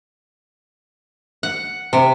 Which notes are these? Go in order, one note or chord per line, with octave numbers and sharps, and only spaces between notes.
F#5
C3